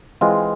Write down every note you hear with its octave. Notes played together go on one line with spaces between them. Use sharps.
E3 G#3 C4 F4